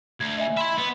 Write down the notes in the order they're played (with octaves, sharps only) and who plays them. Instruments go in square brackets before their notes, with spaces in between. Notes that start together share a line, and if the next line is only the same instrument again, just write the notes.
[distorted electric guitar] D2 [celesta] G#6
[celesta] D#5 E5 G#5
[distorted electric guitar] E4 E5 [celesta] B5 C6
[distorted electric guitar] B3